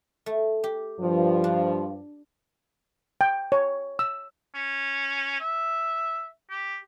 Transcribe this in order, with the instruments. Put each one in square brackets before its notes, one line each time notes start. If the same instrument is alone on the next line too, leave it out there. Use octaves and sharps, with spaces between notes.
[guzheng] A3
G4
[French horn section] G2 F3
[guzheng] D4
[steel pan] G5
C#5
E6
[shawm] C#4
E5
G4